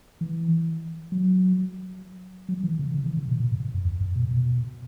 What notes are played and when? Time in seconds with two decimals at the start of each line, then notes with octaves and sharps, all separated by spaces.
0.21 E3
1.12 F#3
2.49 F#3
2.64 E3
2.79 C#3
2.94 C#3
3.06 E3
3.17 C#3
3.28 B2
3.40 B2
3.51 G#2
3.74 F#2
3.85 E2
4.01 F#2
4.16 B2
4.31 B2